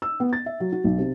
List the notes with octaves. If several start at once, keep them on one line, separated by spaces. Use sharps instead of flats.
E6
B3
A6
E5
F#3
F#4
B1
C3